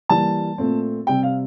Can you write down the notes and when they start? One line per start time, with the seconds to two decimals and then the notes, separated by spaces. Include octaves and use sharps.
0.09 E3 G3 A#3 A5
0.58 A#2 A3 C4
1.06 C3 G3 C4 G5
1.23 F5